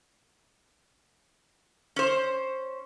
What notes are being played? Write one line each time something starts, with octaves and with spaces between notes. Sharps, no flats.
C#4 C5